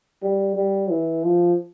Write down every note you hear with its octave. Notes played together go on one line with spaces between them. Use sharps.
G3
G3
E3
F3